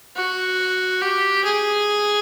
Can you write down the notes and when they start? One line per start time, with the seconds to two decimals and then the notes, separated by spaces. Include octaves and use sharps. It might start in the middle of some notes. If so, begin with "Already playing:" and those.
0.16 F#4
1.01 G4
1.44 G#4